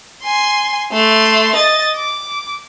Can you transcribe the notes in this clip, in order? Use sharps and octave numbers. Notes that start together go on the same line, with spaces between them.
G#5 C6
A3 C6
D#5 A6
D6